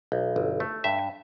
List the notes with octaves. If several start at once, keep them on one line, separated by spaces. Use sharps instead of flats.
B1
G1
A3
G2 E5